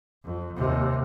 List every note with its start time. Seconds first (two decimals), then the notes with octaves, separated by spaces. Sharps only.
0.24 F2
0.56 D#2 C3